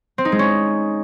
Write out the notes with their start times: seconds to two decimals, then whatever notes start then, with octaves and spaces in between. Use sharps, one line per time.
0.18 C4
0.25 D#4
0.32 G#3
0.39 C#4